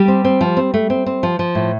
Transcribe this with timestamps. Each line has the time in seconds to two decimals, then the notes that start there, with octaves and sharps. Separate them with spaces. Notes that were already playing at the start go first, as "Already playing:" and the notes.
Already playing: G3 G4
0.08 C4
0.24 C4
0.41 F3
0.57 C4
0.74 A3
0.90 C4
1.06 C4
1.23 F3
1.39 F3
1.55 A2